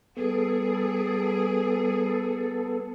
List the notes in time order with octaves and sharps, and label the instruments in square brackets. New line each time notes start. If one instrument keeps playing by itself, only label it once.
[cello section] G3 G#4 [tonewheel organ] B3 A4